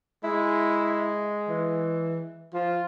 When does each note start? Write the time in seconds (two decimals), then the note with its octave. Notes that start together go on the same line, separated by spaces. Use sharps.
0.24 G#3 E4
1.49 E3
2.54 F3 F4